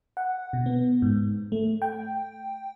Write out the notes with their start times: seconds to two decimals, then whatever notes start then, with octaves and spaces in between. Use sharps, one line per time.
0.17 F#5
0.53 B2
0.66 B3
1.02 G#2
1.52 A3
1.82 G5